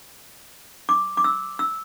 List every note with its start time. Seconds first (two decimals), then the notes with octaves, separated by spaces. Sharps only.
0.89 D6
1.17 D6
1.24 E6
1.59 E6